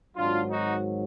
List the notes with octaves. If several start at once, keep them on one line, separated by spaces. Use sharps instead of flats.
G#1 G#2 F#3 D4 F4
D#4 F#4